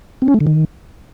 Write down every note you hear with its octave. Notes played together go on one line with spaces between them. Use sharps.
C4
C#4
A3
D3
D#3